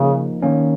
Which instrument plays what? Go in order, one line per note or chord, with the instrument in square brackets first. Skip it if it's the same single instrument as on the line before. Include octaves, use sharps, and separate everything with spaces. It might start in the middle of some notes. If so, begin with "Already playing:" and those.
Already playing: [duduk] C#3 [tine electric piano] F3 A#3 D#4
[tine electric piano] D#3 A#3 C#4